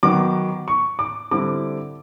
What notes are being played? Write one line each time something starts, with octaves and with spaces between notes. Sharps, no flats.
D#3 F#3 B3 D6
C#6
D6
D3 G3 C4 E4 D6